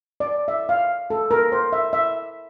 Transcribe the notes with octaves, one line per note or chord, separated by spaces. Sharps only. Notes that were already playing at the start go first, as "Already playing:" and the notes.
D5
E5
F5
A4
A#4
C5
E5
E5